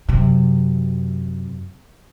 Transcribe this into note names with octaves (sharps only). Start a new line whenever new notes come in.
F#2 C3